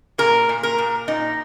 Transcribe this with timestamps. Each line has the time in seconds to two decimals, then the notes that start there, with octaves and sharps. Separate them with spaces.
0.18 A#2 A#4
0.49 A#2
0.63 A#4
0.78 A#2
1.08 A#2 D#4